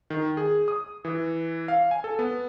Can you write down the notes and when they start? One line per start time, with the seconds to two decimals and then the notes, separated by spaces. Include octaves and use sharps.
0.10 D#3
0.37 G#4
0.68 D#6
1.05 E3
1.68 F5
1.91 G#5
2.04 A4
2.19 B3